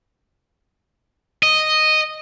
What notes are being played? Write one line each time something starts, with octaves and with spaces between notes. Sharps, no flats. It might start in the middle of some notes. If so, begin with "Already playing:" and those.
D#5